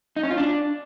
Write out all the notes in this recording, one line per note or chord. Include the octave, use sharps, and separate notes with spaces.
D#4
C#4
F4
D4